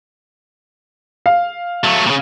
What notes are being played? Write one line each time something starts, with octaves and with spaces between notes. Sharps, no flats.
F5
F#3 A3
A#2 C#3